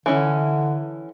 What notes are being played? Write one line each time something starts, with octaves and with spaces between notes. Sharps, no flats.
D3 E3 C#4 E4